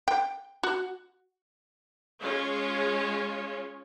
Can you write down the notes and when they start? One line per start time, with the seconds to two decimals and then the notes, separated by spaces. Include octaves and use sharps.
0.08 G5
0.63 F#4
2.22 G#3 C#4 F4 C#5